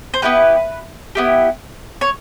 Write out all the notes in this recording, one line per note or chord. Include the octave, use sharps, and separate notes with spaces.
C5
B3 E4 G4 B4
B3 E4 G4
C#5